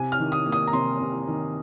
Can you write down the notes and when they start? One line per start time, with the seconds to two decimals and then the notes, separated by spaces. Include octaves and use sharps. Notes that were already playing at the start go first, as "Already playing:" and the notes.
Already playing: C3 G#5
0.12 F6
0.19 D#3
0.32 D#6
0.46 A#3
0.52 D#6
0.67 A#5
0.73 C3 C6
1.00 C3
1.27 D#3